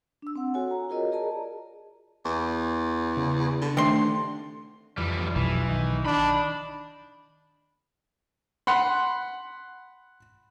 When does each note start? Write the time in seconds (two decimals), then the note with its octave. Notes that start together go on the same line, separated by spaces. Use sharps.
0.22 D4 E6
0.36 C4 F#5
0.54 F#4 A4 C#5 F#5 G#5
0.71 A#5
0.89 F4 F#4 G#4 A#4 C#5 D#5
1.12 G#4 A#4 D5 D#5 A5 A#5
2.25 E2
3.17 C#3
3.62 D3
3.77 C3 D#3 A3 D4 C6
4.97 F2 E3 G3
5.36 B1 E3
5.68 D#3
6.06 D4 B5
8.67 F#5 B5 C6